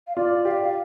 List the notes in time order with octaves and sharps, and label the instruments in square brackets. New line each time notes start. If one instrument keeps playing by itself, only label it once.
[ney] F5
[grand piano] F4 [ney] D5
[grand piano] G4 [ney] F5
[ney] D5
F5